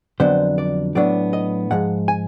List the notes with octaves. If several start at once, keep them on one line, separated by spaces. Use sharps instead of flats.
F2 D3 F#3 B3 D4 C5
D5
A2 F#3 B3 D4 D5
D#5
G#2 F3 G#3 F#5
G#5